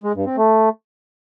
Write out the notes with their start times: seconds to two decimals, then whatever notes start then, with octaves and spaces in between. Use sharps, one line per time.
0.04 G#3
0.15 G2
0.26 C4
0.37 A3